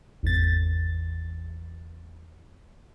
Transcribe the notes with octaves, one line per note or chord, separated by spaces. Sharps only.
G#1 E2 A6